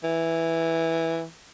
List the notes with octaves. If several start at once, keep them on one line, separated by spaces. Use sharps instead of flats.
E3